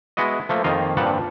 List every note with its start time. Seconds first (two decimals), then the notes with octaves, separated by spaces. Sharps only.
0.17 G#3 B3 E4 F#4 D#5
0.49 F3 A3 A#3
0.64 F2 D#3 A#3 F4 D#5 F5
0.97 G2 A#2 F3 G3 F#5 A5